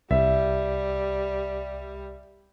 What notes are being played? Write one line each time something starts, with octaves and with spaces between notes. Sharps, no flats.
C2 G3 E5